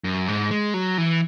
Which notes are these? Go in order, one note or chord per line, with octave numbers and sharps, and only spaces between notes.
F#2
G#2
G#3
F#3
E3